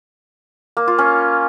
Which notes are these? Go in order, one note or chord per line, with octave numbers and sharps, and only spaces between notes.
A#3
F4
C#4